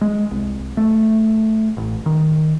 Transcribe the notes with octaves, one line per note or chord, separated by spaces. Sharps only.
G#3
C2
A3
A1
D#3